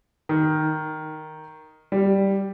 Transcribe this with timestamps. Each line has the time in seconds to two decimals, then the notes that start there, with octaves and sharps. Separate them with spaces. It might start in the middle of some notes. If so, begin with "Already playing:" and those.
0.29 D#3
1.92 G3